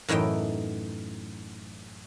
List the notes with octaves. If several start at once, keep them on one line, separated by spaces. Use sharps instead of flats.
F#2 A2 E3 D#4 G5